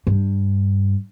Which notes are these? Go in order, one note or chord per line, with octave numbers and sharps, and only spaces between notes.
G2